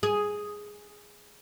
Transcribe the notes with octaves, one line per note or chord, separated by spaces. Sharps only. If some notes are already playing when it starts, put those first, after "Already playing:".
G#4